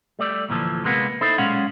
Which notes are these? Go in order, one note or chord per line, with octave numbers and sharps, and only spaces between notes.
G3 A3 D5
D2 A#2 E3 F3 A4
C3 G#3 A#3 B3
D#4 E4 A4 C5
B1 A#2 G#3 C#4 F5 F#5